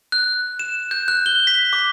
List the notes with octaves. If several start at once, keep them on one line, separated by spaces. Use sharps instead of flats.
F#6
E7
G6
F#6
G7
B6
D6